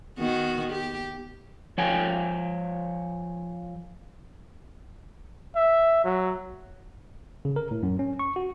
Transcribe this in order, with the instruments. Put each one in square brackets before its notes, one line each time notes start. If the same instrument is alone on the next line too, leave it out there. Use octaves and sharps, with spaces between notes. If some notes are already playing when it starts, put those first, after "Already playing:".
[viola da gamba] D#3 B3 F#4
G4
[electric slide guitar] F3 C#5 G5 G#5 A#5
[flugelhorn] E5
F#3
[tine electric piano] C#3
A#4
A2
F#2
C#4
C#6
F#4